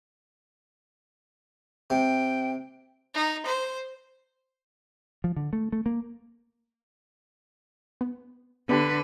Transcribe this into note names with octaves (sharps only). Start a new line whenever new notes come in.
C3 G5
D#4
C5
F3
D3
A3
A3
A#3
B3
D3 B3 D4 G4 B4